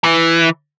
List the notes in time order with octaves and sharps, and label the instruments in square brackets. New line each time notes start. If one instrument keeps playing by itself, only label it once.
[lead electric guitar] E3